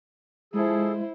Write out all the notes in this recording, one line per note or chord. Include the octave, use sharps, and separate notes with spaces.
F3 G#3 E4 G#4 A4 C5